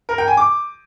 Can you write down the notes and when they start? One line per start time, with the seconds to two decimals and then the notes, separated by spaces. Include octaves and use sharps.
0.09 A#4
0.18 G5
0.28 G#5
0.37 D6